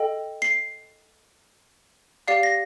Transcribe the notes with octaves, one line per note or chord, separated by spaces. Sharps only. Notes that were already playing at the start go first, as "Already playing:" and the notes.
Already playing: A4 D#5 G5
C7
G4 D5 F5 C7
A#6